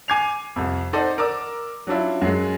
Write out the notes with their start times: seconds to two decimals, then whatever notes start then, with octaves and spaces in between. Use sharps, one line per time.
0.08 G#5 D6 G#6 C7 F7
0.56 C2 F2
0.93 D#4 A4 C5 D5 F#5
1.18 A#4 D5 D6 E6
1.87 F#3 C#4 D4 E4 F4
2.21 F#2 F#3 G#3